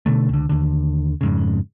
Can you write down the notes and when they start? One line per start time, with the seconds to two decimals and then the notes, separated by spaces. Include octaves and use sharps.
0.06 B2 D3 A3
0.29 C#2 D3
0.49 D#2 D3
1.21 F2 G#2 C#3